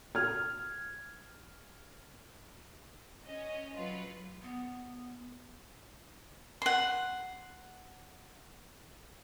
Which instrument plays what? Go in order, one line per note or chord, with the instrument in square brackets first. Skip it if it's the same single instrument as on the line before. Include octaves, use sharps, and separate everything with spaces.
[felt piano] F6 G#6
[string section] C#4 D#5
F#3 F4 B4
[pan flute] B3
[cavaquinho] F#5 C6